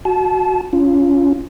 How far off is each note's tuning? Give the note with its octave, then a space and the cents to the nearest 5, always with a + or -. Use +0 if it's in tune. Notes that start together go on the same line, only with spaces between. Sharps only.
F#4 -5 A5 -30
C#4 +15 F4 +0